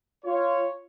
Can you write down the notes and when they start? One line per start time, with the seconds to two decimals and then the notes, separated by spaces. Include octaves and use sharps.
0.24 F4 C#5